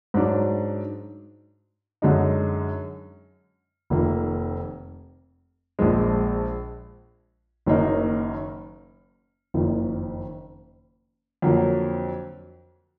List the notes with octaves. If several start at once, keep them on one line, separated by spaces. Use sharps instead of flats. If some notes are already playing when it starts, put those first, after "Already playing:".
G#2 F#3 D4
F#2 D3 G#3 D#4
F1 F2 D#3 A#3
A#1 A#2 F3 G#3
F#1 F#2 D#3 A#3 D#4
F#1 F2 D#3
F2 D3 F#3 A#3